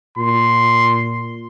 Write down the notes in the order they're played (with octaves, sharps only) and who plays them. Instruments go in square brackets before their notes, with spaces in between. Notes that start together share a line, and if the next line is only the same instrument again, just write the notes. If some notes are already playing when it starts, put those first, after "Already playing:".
[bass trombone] A#2 [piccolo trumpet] C6